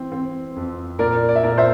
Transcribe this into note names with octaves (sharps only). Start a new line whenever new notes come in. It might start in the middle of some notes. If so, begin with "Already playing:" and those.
Already playing: E3 C4
C4
F2
A#2 A#4 D5
D5
E5
A#2 A#4 D5
C5 E5